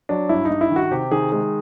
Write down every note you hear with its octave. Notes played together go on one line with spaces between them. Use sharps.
F#3 D4
G2 E4
D#4
G2
E4
D#3
F#4
C3 G4
D#3 G#4
G#3 G#4